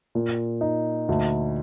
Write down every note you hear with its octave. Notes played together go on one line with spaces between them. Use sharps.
A#2
D#4
D2